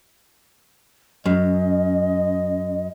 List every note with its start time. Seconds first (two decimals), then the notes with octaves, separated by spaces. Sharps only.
1.26 F#2 C#4 D#5